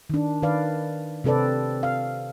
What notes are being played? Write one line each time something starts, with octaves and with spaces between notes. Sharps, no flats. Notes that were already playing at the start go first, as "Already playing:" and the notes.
D#3 D4
D#3 B4 D5 F5
C3 C4 A4 B4 D5
F5